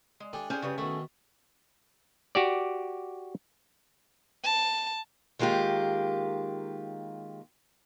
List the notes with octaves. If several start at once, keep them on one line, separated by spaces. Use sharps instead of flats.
G#3
D4 G4 A4 G#5
C#4 G#4 C5 G#5
C#3 G3 B4
B2 D#3 A3
F#4 G4 D5
A5
D#3 G#3 A#3 F4 G4